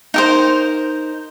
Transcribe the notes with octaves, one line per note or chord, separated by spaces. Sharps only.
D#4 A#4 C5